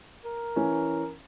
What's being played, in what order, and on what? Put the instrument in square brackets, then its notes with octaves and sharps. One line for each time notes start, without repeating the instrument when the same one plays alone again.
[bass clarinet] A#4
[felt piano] E3 C#4